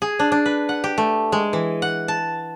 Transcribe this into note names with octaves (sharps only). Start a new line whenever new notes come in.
G#4
D4
D4
B4
F#5
G4
A3
G#3
E3
F#5
A5